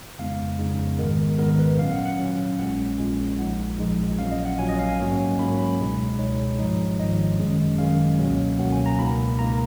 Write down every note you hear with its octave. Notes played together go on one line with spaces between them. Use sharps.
F2 C#3 G#3 B3 D#4 F5
F2 C#3 G#3 B3 D#4
G#1 G#2 D#3 G#3 B3 A#4
G#1 G#2 D#3 G#3 B3 A#4
B4
A#2 F#3 C#4 F5
F#5
F#5
A#2 F#3 C#4
A#1 A#2 G#3 C#4 F#5
A#1 A#2 G#3 C#4
A#1 A#2 F3 G#3 D#4 F#5
A#1 A#2 F3 G#3 D#4
A#1 A#2 F#3 C#4 F5
D#5
F#5
A#1 A#2 F#3 C#4 G#5
D#5
F5
G#5
G#2 F#3 A#3 C#4
G#2 F#3 A#3 C#4 B5
B5
C#2 B2 G#3 D#4
C#2 B2 G#3 D#4 C#5
G#1 G#2 F3 G#3 D#4
G#1 G#2 F3 G#3 D#4 D#5
G#1 F#2 D#3 G#3 C#4
G#1 F#2 D#3 G#3 C#4 F5
C#2 B2 F#3 A#3 C#4
C#2 B2 F#3 A#3 C#4 F#5
G#5
A#5
C#2 B2 A#3 D#4 B5
C#2 B2 A#3 D#4 A#5